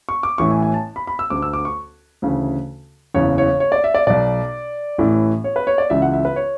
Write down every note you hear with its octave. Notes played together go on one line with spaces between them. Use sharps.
C#6
D6
A1 A2 E3 C#6
G#5
G#5
A5
B5
B5
E6
D2 D3 D6
E6
D6
C#6
D2 C#3 E3
F#1 E2 C#3 E3 C#5
C#5
C#5
D5
E5
D5
B1 B2 D5
A1 A2 E3
C#5
B4
C#5
D5
C#2 C#3 E3 E5
F#5
E5
B4
C#5